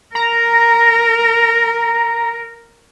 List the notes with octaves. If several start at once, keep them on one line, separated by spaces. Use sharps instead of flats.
A#4 A#5